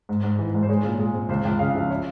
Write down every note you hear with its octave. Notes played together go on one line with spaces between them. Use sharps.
G#2
G#2
E3
G#2
C5
G#3 C#5
A#2
G#3
C4
C#2 C5
C#2 G5
C#3 F5
F3 E5
C#5